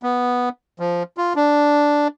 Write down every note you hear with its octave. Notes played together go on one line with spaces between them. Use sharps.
B3
F3
F4
D4